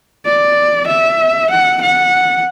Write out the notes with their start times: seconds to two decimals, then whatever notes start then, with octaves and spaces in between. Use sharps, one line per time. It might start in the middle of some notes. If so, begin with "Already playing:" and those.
0.25 D5
0.87 E5
1.51 F#5
1.82 F#5